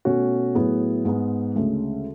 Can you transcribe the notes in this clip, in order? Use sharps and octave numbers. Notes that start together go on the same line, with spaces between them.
B2 A3 C#4 F#4
A2 F#3 B3 E4 G#4
G#2 G#3 B3
D2 C#3 G#3